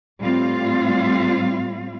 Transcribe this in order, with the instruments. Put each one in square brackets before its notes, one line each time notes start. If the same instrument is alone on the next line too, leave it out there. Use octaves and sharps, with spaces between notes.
[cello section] A2 G3 C4 F4 F5